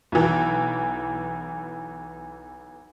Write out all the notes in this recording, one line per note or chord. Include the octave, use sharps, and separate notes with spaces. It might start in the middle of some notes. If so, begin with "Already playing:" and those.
B1 E3